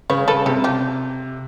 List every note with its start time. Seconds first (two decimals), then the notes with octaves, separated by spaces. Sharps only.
0.10 C#3 B4 C#5
0.28 C#3 A4 B4
0.46 C3 G4 A4
0.64 F4 G4